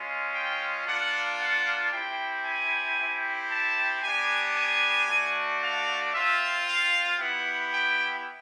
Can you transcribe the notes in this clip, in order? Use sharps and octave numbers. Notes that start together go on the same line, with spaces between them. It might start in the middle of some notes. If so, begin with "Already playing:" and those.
Already playing: G#3 C#4 F4
G5
A#3 D4 F4 F#5
F#5
C4 E4 G4 G5
G#5
C4 E4 G4
A5
B3 D4 G4 G#5
G#5
A3 D4 F#4
F5
C4 F4 E5
F5
B3 E4 G4 F#5
G5